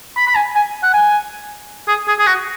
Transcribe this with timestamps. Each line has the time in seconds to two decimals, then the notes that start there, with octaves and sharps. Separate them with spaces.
0.17 B5
0.27 B5
0.35 G#5
0.55 G#5
0.83 F#5
0.94 G#5
1.88 G#4
2.08 G#4
2.19 G#4
2.27 F#4